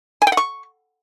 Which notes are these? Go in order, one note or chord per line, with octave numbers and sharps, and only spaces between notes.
G#5
G5
F#5
C#6